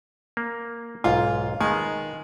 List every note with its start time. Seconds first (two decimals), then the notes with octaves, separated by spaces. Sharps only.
0.37 A#3
1.04 B1 G#2 F4
1.60 D#3 G#3 B3